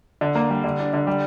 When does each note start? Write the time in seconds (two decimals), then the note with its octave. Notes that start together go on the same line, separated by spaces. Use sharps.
0.21 D3
0.35 A#3
0.50 G3
0.64 D3
0.79 D4
0.93 D3
1.07 G3